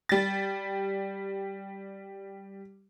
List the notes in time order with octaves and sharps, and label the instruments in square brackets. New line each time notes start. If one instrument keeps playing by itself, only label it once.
[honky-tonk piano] G3 A6